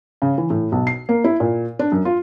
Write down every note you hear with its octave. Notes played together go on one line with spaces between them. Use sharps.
C#3
E3
A2
B1
C7
A#3
E4
A#2
D4
F#2
F4